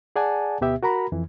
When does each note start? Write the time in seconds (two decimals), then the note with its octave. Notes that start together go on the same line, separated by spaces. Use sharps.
0.16 G#4 D5 F#5 G#5 A5
0.61 D2 B2 B3 G4 E5
0.83 F#4 A#4 A#5 B5
1.12 F2 E3